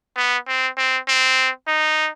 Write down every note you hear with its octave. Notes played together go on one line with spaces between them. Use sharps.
B3
C4
C4
C4
D#4